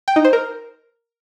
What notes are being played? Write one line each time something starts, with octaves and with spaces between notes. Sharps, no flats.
G5
D#4
C5
A#4